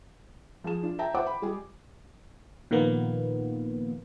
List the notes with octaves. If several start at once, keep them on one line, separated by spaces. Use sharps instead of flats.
F3 G#4 A5 E7
D4 F4
E5 G5 A5 A#5
C5 E5 F#5 G5 D6
B5
G3 G#3 G#4
A#2 D#3 F3 A#3 B3